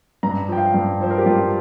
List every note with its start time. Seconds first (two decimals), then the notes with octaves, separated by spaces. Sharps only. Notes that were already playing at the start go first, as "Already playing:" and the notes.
0.23 G2 A#5
0.48 F3 G5
0.57 F5
0.74 G2
1.00 F3 C5
1.10 A#4
1.18 G4
1.26 G2 F4